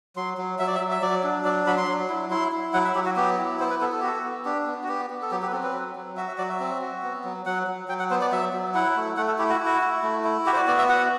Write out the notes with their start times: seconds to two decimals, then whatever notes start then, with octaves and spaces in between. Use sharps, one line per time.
0.16 F#3 C6
0.38 F#3
0.59 F#3 E5
0.67 D5
0.75 E5
0.80 F#3
0.91 E5
1.02 F#3 D5
1.24 D4
1.45 F#3 D5
1.67 F#3 B5
1.77 C6
1.88 F#3
2.10 E4
2.31 E4 C6
2.52 E4
2.74 F#3 F#5
2.85 E5
2.95 F#3 G4
3.06 F#4
3.16 B3 G4
3.38 E4
3.60 B3 C5
3.70 B4
3.81 B3 A4
3.92 A4
4.00 F#4 G4
4.07 A4
4.24 B3
4.45 D4 G4
4.67 B3
4.83 F#4
4.88 B3 G4
5.10 B3
5.22 A4
5.31 F#3 G4
5.42 G4
5.47 B4
5.52 C4 A4
5.63 B4
5.74 F#3
5.96 F#3
6.17 F#4 E5
6.28 E5
6.38 F#3 D5
6.49 E5
6.60 C4
6.81 F#4
7.03 B3
7.24 F#3
7.46 F#3 F#5
7.67 F#3
7.88 F#3 G5
7.99 F#5
8.10 B3 C5
8.21 D5
8.32 F#3 E5
8.53 F#3
8.74 E4 F#5
8.96 A3
9.17 A3 F#5
9.28 A4
9.38 E4 G4
9.49 F#4
9.60 E4
9.66 F#4
9.82 E4
10.03 A3
10.24 E4
10.46 F#4 G4
10.53 C5
10.56 D5
10.67 B3 D5
10.78 E5
10.89 F#4 F#5